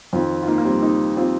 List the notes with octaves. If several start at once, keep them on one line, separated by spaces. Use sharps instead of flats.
F2 D#3 C4 F4
F4
A#3 D#4
A#3
G3 C4
A#3 D#4
C4 F4